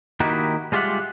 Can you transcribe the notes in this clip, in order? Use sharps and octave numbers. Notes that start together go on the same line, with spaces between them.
D#3 A#3 D#4 E4 F#4 G4
G3 G#3 F4 G4 E5 F#5